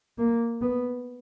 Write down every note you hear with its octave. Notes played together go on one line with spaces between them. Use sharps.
A#3
B3